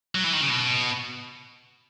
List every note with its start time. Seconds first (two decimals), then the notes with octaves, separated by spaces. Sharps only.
0.15 F#3
0.24 E3
0.33 D#3
0.41 C#3
0.50 B2